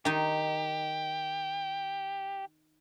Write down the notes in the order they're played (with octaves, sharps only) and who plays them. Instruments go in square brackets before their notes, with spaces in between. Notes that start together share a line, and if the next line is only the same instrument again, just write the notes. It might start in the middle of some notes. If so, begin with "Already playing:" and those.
[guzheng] D#3 D#4 [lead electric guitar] G4